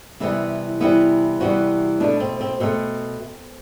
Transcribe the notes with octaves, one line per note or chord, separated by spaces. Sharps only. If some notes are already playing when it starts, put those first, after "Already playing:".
C3 E3 G3 B3 E4
C3 E3 G3 B3 E4
C3 E3 G3 B3 F#4
B2 A3 D4
C4
C4
B2 A3 C4